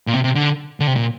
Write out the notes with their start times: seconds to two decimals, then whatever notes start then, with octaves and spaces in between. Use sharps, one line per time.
0.07 A#2
0.14 C3
0.24 C3
0.35 D3
0.80 D3
0.87 C3
0.96 A#2